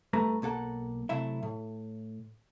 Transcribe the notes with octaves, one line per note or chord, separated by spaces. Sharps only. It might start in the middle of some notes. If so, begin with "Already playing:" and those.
G2 A3 B4 A#5
B1 A#3 A4 F#5
C3 F#3 A3 E4 E5
A2